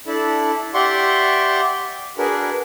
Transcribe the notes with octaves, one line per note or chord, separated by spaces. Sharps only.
D4 E4 A4
G4 D5 E5 F#5 C6 C#6
D4 F#4 G#4 A#4 B4